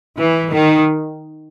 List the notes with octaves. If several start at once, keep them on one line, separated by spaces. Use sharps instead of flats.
E3
D#3